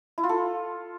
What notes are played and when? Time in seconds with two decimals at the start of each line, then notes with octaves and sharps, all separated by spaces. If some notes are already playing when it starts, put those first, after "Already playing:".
0.18 E4
0.24 F4
0.29 A4